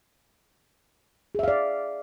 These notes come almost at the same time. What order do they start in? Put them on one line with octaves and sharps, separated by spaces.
G#4 E5 F5 D5